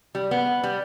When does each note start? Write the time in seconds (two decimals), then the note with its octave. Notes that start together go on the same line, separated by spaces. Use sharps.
0.15 G3
0.31 B3
0.64 G3